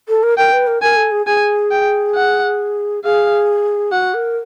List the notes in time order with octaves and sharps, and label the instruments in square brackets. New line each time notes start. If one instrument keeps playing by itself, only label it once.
[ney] A4
A#4
[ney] A#4 [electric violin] G5
[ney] B4
A#4
[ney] A#4 [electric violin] G#5
[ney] A4
G#4
[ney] G#4 [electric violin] G#5
[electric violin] G5
F#5
[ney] G#4 [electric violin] F5
[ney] F#4 [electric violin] F#5
[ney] A#4